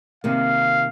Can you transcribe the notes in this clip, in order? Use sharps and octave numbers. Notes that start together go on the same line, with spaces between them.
C3 D#3 A#3 F5